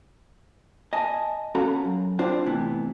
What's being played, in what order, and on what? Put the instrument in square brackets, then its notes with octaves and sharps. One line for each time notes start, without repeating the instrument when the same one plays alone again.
[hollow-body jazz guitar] D#5 G#5 A5
C#4 F#4 A4 F5 A#5 B5
F#2
C4 D4 F4 C5 D5
A2 C3 E3 B3